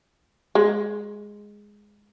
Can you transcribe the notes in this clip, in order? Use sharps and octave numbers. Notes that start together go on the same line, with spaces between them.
G#3